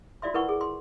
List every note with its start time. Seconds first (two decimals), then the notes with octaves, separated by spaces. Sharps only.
0.22 F4 F#4 D5 E5 C6
0.34 E4 A#4 B4 F#5 C#6
0.49 G#4
0.61 C6